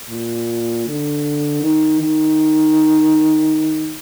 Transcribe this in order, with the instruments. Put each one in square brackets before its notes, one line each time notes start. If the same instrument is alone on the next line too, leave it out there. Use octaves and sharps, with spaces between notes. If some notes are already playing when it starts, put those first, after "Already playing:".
[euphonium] A#2
D3
D#3
D#3